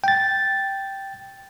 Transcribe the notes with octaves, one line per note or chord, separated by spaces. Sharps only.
G5 A6